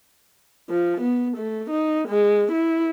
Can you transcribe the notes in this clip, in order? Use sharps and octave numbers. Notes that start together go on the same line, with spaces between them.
F3
B3
A3
D#4
G#3
E4